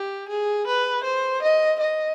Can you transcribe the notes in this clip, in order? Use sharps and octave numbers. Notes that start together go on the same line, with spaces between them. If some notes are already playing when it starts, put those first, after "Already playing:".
Already playing: G4
G#4
B4
C5
D#5
D#5